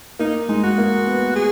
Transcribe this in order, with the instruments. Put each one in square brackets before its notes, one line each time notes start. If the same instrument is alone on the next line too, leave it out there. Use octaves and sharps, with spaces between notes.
[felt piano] A#3 [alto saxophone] D#4
[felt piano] G#3 [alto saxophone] D#4
[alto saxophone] F#4
[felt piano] A#3
B3
[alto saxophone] G#4